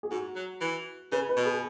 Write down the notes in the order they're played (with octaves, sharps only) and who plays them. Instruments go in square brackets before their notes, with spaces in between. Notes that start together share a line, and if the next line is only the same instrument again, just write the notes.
[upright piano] G#4
[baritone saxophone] G#2 [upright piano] F#4
[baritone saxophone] F#3
E3
[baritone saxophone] C#3 [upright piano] B4
[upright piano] B4
[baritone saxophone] B2
[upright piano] G#4